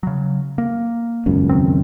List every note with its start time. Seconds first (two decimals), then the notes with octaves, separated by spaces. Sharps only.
0.03 C#3 F#3
0.58 A#3
1.26 E1 C#2 F#2
1.49 D#3 C4